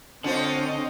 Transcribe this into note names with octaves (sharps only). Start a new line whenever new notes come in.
D3 C4 C#4 F4 C5 D#5